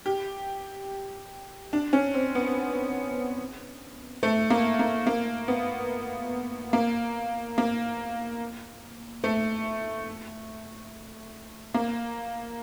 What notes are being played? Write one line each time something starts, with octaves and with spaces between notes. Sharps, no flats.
G4
D4
C#4
C4
B3
A3
A#3
A#3
A#3
B3
A#3
A#3
A3
A#3